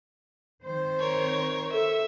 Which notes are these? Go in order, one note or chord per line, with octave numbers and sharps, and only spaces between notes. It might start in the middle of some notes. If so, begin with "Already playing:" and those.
D#3 C4 C5
A#4 C#5
A4 E5